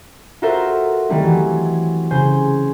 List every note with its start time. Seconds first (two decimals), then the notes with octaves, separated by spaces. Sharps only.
0.42 F4 F#4 A4 A#4 C5 E5
1.09 D#3 F#3 G3 A3 C4 E4
1.23 E3 F#3 G#5
2.11 C#3 C5 G#5 G6